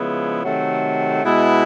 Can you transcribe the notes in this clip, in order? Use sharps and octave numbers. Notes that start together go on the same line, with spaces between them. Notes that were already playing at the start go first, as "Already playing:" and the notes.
Already playing: C#3 F3 G#3 B3 E4
C3 D#3 F#3 A3
B2 G#3 B3 E4